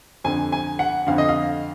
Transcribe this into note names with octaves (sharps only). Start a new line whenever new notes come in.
F2 D3 G#5
G#5
F#5
F2 D3 F5
D#5
F5